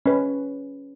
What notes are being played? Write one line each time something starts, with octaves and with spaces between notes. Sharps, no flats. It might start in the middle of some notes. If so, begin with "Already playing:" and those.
C#4 B4